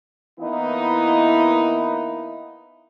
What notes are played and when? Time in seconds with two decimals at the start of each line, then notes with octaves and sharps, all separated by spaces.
0.40 E3 A#3 B3 D#4 E4